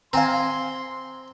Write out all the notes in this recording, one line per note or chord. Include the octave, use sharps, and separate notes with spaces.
C4 F5 G#5 A#5 C6